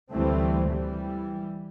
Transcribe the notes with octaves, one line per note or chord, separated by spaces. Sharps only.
D2 E3 G3 A3 C4
E3 G3